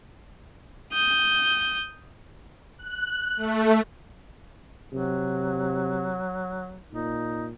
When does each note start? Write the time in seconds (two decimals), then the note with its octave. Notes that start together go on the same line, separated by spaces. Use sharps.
0.93 D#6 G6
2.78 F#6
3.37 A3
4.92 C3 F#3
6.93 A#2 D#4